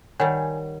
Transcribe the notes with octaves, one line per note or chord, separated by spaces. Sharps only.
D#3 G3 C#5 F#5 G#5